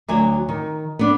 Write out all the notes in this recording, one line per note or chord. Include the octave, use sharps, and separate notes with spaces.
D2 F#3 G#5
D#3
B3 D4